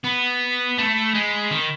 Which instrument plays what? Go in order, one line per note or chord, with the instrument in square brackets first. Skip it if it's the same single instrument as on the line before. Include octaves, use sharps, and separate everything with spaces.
[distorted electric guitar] B3 [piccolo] B5
[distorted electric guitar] A3
G#3
D#3